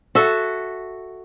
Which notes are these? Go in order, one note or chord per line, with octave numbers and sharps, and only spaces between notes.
F#4 A4 E5